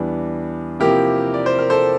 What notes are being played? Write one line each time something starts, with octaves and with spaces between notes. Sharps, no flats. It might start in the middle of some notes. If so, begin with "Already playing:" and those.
Already playing: E2 E3 G3 D4
C3 F3 A#3 E4 G4 A#4
D5
C5
A#4
A4 C5